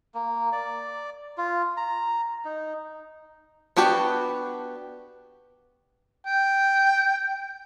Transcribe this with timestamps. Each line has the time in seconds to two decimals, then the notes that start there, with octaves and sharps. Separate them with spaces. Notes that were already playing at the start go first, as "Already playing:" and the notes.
0.14 A#3
0.52 D5
1.38 F4
1.77 A#5
2.45 D#4
3.77 B3 D4 F#4 G4 B4
6.26 G5